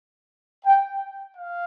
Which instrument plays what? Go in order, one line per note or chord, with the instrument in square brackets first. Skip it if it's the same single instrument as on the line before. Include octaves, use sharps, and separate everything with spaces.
[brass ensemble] G5
F5